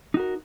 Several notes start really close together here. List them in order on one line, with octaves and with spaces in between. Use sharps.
D#4 F#4 A#4